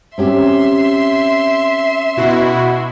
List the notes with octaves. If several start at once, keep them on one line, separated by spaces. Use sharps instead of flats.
C4 C#4 G4 E5 C6
B2 E4 F#4